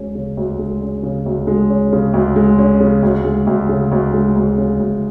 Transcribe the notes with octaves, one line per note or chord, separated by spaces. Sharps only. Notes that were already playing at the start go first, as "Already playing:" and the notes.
Already playing: D2 G#3 C#4
C#3
D2
G#3
C#4
C#3
D2
G#3
C#4
C#3
D2
G#3
C#4
C#3
D2
G#3
D2
C#3
D2
G#3
D2
C#3
D2